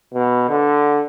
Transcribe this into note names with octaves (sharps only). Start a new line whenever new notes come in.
B2
D3